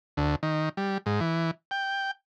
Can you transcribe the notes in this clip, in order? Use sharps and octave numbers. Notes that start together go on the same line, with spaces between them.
D2
D#3
G3
G#2
E3
G5